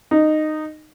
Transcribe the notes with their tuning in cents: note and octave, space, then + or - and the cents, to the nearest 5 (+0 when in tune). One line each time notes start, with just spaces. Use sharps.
D#4 -15